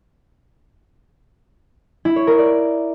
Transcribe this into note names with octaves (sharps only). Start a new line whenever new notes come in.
E4
C#5
A#4
D5